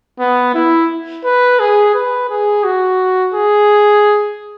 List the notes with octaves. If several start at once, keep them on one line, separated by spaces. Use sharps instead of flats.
B3
E4
B4
G#4
B4
G#4
F#4
G#4